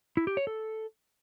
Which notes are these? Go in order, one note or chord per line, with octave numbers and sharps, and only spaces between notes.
E4
G4
C#5
A4